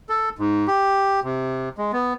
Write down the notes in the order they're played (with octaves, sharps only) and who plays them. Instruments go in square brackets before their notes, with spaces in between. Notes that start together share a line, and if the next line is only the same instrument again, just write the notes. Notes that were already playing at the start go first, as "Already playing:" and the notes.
[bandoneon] A4
G#2
G4
C3
G#3
B3